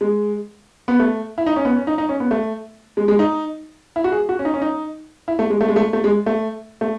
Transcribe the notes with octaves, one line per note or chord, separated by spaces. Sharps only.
G#3
B3
A3
E4
D#4
C#4
B3
C#4
D#4
D#4
C#4
B3
A3
G#3
G#3
D#4
E4
F#4
G#4
F#4
C#4
D#4
C#4
D#4
E4
A3
G#3
A3
G#3
A3
A3
G#3
A3
A3